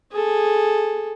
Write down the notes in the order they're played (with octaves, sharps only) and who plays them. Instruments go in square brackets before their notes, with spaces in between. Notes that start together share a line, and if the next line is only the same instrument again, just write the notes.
[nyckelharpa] G#4 A4